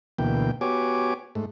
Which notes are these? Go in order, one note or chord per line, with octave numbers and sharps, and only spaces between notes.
D2 B2 E3 A#3 G5
B3 F#4 G4 C#5 G#5 D6
G#2 A3